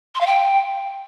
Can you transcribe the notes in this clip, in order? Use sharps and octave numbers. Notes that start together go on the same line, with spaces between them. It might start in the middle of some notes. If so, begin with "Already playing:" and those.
C6
F5
G5